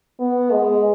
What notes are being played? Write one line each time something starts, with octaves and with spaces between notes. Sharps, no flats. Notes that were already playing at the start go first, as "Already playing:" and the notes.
B3
G#3